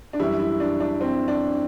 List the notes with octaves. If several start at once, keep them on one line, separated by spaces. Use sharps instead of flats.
D4
F#2 E3 G3 E4
E4
D4
D4
C4
D4